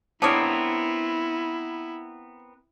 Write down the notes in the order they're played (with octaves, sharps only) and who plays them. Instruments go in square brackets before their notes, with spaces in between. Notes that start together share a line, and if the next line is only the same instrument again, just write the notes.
[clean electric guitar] B3 C4 A#4 [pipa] D4 G#4 C#5 [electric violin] E4